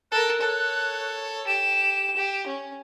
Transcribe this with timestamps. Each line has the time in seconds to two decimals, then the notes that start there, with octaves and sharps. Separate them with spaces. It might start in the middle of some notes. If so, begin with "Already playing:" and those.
0.12 A4 A#4 F#6
0.41 A4 C#5
1.47 G4 E7
2.17 G4
2.47 C#4